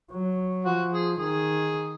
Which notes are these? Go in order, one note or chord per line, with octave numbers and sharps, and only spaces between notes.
F#3
F3 F#4
G#4
D#3 G#4